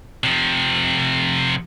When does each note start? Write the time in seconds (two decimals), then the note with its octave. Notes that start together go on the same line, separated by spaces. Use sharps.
0.24 C3 F3